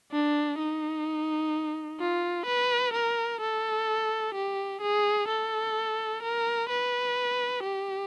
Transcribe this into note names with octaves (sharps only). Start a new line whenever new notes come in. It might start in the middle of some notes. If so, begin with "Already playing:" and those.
D4
D#4
F4
B4
A#4
A4
G4
G#4
A4
A#4
B4
G4